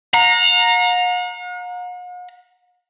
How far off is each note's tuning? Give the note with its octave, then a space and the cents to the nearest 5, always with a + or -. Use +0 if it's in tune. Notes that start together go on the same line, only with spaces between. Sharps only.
F#5 -45 A#5 +0